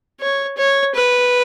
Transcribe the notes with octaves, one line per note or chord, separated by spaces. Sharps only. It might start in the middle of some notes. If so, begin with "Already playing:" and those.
C#5
C#5
B4